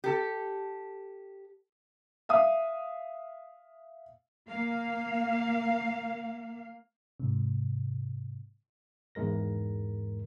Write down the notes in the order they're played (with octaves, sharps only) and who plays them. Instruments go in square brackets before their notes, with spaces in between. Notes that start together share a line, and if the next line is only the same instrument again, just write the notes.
[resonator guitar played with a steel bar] G4 A4
[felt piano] E5 F5 D#6
[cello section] A#3 F5
[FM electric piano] G#2 C3
[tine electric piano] E2 G#2 G#3 A#4 A#6